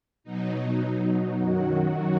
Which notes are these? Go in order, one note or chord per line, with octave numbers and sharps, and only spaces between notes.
B2 F#3 D#4
F#2 D#3 F#3 F#4